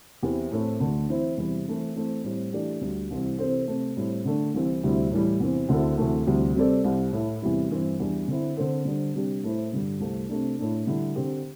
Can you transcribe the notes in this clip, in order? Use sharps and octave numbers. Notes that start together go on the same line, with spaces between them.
E2 E3 C4 E4 G4
A2 A3 C4 E4
D2 D3 A3 D4
E3 C4 E4 C5
E2 C3 E3 G3 E4
E3 A3 C4 E4
E3 A3 C4
A2 G3 C4
E3 A3 D4 G4 D5
D2 D3 G3
C2 C3 E3 G3 C4
C3 E3 C4 A4 C5
C3 A3 C4
A2 G3 C4
D3 A3 D4
C2 C3 E3 C4
D2 C3 G3 C4 E4
A2 E3 G3
E2 C3 E3 C4
D2 D3 C4 E4 A4
D2 C3 E3 A3
D2 C3 E3 G3
C3 G3 C4 A4 D5
C2 C3 G3 C4
A2 A3 E4
E2 C3 G3 E4
G2 E3 C4
E2 E3 G3 D4
D3 C4 E4
D3 C4 A4 C5
D3 G3 D4 C5
C3 G3 D4 G4
A2 A3 E4 C5
G2 D3 G3
C2 C3 A3
C3 A3 D4
A2 A3 D4
D3 G3 E4
D3 C4 G4 C5